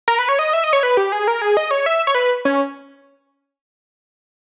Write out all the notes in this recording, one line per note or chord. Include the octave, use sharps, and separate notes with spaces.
A#4
B4
C#5
D#5
E5
D#5
C#5
B4
G4
G#4
A#4
G#4
D#5
C#5
E5
C#5
B4
C#4